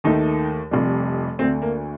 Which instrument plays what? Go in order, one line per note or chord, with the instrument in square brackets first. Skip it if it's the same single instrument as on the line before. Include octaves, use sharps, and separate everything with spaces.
[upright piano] D#2 D#3 A3 D#4
F1 F2 C3 G3
D2 D3 A3 C4
A#3